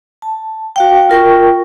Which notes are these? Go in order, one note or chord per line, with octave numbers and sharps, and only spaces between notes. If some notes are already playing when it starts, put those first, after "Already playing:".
A5
F#4 F5 G5
F4 A#4 G5 C#6